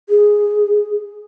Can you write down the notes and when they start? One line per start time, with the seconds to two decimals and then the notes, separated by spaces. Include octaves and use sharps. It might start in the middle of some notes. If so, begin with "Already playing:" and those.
0.09 G#4